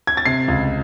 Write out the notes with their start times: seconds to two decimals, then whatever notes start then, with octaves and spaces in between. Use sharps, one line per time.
0.07 G#6
0.17 A6
0.25 C3 C7
0.48 C#2